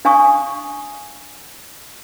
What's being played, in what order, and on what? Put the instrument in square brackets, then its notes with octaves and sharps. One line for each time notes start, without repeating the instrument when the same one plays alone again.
[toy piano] D4 F5 G#5 C#6 D#6